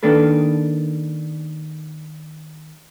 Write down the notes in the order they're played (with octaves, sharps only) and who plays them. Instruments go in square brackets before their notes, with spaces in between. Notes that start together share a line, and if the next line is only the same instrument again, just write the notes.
[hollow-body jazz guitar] D#3 A#3 D4 A4 B4